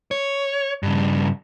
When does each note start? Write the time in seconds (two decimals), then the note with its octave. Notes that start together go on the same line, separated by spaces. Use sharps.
0.11 C#5
0.83 G2 C#3